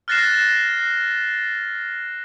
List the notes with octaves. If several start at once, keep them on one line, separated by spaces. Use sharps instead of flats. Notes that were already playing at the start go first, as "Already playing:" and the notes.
F6 F#6 A6 A#6 C7 E7